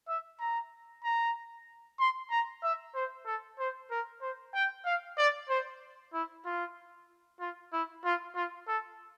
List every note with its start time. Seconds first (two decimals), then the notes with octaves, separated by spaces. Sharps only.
0.08 E5
0.40 A#5
1.04 A#5
1.99 C6
2.30 A#5
2.63 E5
2.95 C5
3.26 A4
3.59 C5
3.91 A#4
4.21 C5
4.54 G5
4.85 F5
5.18 D5
5.49 C5
6.13 E4
6.45 F4
7.40 F4
7.73 E4
8.04 F4
8.35 F4
8.68 A4